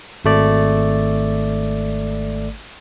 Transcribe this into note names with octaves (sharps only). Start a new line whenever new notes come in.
G#1 A3 D5